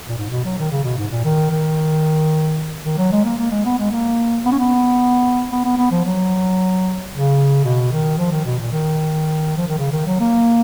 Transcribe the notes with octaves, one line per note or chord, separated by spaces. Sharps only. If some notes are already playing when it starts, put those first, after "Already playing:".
A#2
G#2
B2
F#3
D#3
C#3
B2
G#2
A#2
D#3
D#3
D#3
F#3
G#3
A#3
A#3
G#3
B3
G#3
A#3
B3
C#4
B3
B3
B3
B3
F3
F#3
C#3
B2
D#3
F3
D#3
B2
A#2
D#3
F3
D#3
C#3
D#3
F#3
A#3